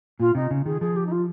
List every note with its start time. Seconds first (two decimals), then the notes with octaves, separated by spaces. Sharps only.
0.20 A#2 F4
0.35 C3 D#4
0.51 C#3
0.66 D#3 G#4
0.81 F3 G#4
0.96 G4
1.06 D#4
1.11 F4